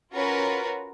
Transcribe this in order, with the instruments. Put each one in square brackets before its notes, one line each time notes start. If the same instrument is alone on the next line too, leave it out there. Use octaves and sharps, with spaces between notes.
[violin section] C#4 F4 F#4 A#4 B4